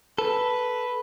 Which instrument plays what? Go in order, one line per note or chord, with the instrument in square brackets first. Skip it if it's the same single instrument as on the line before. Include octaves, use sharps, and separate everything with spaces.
[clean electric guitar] A4 [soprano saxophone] B4